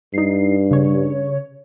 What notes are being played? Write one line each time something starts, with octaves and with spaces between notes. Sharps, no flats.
G2 D#4 C7
C#3 C#5